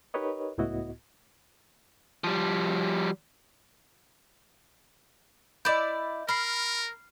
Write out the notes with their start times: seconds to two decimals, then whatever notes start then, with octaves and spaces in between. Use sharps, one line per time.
0.14 D#4 G4 A#4 B4 C#5 D#5
0.58 C#2 A2 B3 E4 F#4 D#5
2.24 F3 G3
5.65 E4 D5 D#5 G6
6.29 A#4 B5 F6 C7